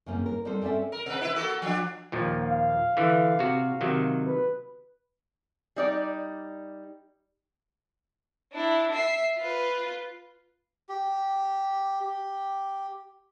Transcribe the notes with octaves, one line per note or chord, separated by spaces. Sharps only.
F#2 C#3 A#3 C4 C#4
A#4
G3 C4 D#4 A4 A#4 C5
C4 C#4 A4 D5 E5
A#4
C3 B4
E4 B4
A#3 F#4 A4
F3 D4
D#2 A#2 F3
F5
D3 E3
C3 F#4
C3 D#3 F#3
B4
G3 D#4 D5
D4 E4
E5 C7
F4 B4
G4
G4